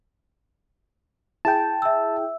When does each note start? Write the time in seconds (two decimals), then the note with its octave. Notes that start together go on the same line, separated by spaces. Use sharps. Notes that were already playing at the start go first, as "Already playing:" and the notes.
1.45 E4 G#4 G5 A5
1.82 E5 E6